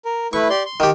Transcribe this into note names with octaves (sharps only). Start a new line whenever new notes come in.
A#4
A3 E4 B4 C#6
G4 D5 C6
C6
D#3 G4